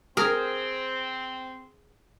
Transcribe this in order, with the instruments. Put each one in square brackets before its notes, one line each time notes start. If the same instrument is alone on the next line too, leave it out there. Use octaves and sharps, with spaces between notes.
[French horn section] C4 [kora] G#4 [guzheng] A#4